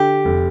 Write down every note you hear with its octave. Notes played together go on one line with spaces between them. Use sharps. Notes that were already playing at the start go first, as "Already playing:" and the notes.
Already playing: D3 G4
F1